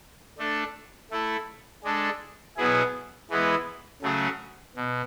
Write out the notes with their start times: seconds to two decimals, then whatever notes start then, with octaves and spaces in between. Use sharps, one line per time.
0.39 A3 D4 A4
1.11 A3 E4 A4
1.84 G#3 D4 A4
2.57 B2 F#3 B3 E4 G#4
3.30 E3 G#3 B3 E4
4.02 C#3 F#3 A3 C#4 G#4
4.76 B2